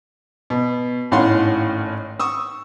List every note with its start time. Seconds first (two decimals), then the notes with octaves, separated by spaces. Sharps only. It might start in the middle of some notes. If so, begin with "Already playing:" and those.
0.50 B2
1.11 G#1 A2 C#4 F5 F#5 C6
2.20 C#6 D#6 E6